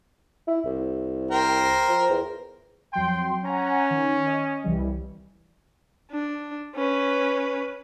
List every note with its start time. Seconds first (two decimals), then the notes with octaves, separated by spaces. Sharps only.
0.48 E4
0.66 C2
1.31 A#4 C5 G5
1.89 F3
2.10 E2
2.93 F2 F#3 G5 C6
3.45 C#4 F#5 G#5 A#5
3.91 D#3
4.27 D#5
4.64 C2 E3 G3
6.11 D4
6.75 C#4 B4